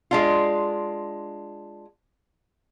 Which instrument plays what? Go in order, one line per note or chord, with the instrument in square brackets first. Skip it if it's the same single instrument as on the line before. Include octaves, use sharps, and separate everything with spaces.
[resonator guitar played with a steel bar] G#3 D4 F4